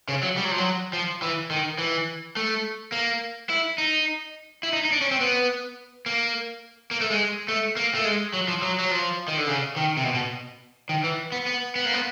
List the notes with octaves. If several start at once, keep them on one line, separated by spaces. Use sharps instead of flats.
C#3
F#3
G3
F#3
F3
F#3
F3
E3
D#3
E3
A3
A#3
E4
D#4
E4
D#4
D#4
D4
C#4
C4
B3
A#3
A#3
A3
G#3
A3
A#3
A3
G#3
F#3
F3
F#3
F#3
F3
D#3
D3
C#3
D#3
C3
B2
B2
D#3
E3
B3
B3
B3
A#3
B3